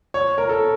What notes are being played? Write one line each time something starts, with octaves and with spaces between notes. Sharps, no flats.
C#5
A#4
A4